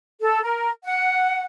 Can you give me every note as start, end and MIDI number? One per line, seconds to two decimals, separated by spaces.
0.21 0.40 69
0.43 0.70 70
0.84 1.44 78